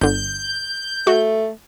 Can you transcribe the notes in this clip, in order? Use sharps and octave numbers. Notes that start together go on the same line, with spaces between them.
G1 D3 G6
A3 F#4